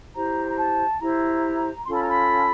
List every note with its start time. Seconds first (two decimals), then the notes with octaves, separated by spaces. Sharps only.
0.14 E4 G4 C5 A#5
0.48 A#5
0.57 A5
1.00 E4 G4 C5 A#5
1.86 C#4 F4 A4 C6
1.93 B5
2.01 A#5
2.08 B5